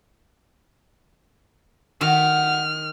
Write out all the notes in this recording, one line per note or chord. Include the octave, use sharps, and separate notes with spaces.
D#3 A3 F#4 F6